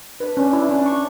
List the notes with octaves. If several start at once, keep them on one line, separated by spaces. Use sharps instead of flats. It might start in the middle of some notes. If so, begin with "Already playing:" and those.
D4 B4
C#4
E4
C#4
C#6